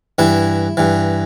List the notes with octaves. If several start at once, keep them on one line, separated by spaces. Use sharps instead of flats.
G2 E3 E4
G2 E3